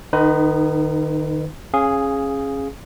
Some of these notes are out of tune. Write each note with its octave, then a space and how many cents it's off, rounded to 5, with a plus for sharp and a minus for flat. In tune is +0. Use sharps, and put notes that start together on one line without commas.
D#3 -30 D#4 +0 B4 +25
C#4 -25 G#4 +0 F5 +0